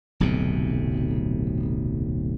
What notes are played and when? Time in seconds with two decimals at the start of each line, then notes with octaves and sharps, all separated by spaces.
0.20 D1 B1 F2 C3